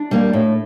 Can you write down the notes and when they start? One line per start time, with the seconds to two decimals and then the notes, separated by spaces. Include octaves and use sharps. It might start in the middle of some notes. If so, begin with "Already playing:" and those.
Already playing: D4
0.11 G3 A#3
0.33 A2